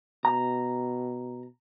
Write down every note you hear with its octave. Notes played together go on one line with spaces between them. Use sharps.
B2 A#5